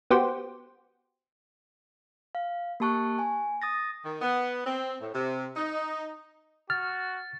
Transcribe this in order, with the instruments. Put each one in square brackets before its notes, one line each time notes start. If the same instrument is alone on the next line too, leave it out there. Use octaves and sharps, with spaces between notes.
[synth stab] B3 F#4 G4 C5
[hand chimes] F5
A#3 G4 A5 C#6 F#6
G#5
D#6 A6 A#6
[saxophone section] D#3
B3
C4
A2
C3
D#4
[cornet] F#4 [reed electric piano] F6 [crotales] A6